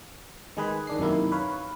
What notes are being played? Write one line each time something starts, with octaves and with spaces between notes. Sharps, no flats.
D#3 G#3 G#4 B4
D#3 D4 C7
F#2 C3 D#3 A#3 E4
B4 C#5 F5